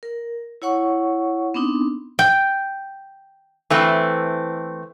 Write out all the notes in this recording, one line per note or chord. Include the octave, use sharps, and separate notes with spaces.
A#4
E4 C#5 F#5 C#6
B3 C4 D4 D#4
G5
E3 A3 C4